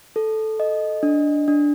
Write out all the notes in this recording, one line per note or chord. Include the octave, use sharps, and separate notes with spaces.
A4
D#5
D4
D4